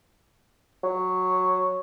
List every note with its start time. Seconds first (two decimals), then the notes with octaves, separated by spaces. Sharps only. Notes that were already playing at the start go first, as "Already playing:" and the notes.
0.83 F#3